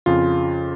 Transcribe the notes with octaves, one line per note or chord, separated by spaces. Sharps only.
F2 C#3 F4